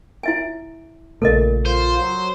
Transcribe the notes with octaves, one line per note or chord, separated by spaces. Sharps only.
E4 E5 G#5
A#1 A#2 C#3 A3 A4 A#4 D#5
F4 C5
F#3